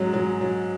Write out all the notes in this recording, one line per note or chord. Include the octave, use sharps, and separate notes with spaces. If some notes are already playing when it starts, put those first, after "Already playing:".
Already playing: G#2 F#3 C#4
F#3
F#3